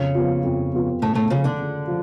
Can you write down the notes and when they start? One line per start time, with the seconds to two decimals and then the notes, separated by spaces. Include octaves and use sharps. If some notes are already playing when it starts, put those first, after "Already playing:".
Already playing: F2 C#3 C#4
0.15 F3 B3 F4
0.44 F2
0.72 F3 B3 F4
1.02 A2 C#3 A3
1.15 A2 A3
1.30 C#3 F3 A3 C#4 F4
1.44 D3 D4
1.59 C#3
1.87 F3